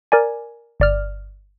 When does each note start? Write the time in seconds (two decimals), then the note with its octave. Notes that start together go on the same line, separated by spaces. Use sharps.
0.12 A#4 D5 G#5
0.80 G1 D5 F6